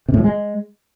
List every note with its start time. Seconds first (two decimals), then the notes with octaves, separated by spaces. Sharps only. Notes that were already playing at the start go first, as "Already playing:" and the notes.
0.08 C3
0.14 A2
0.19 F3
0.24 G#3